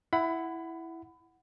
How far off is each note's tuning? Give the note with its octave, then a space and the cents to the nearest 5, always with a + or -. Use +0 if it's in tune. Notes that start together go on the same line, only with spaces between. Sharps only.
E4 +0 F#5 +0 B5 +25